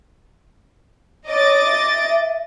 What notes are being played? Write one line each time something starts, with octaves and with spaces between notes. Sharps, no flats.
C#5 D#5 D6 A6
E5